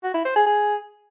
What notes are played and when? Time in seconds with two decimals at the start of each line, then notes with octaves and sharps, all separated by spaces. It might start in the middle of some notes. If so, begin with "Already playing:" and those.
0.04 F#4
0.14 E4
0.25 C5
0.36 G#4
0.47 G#4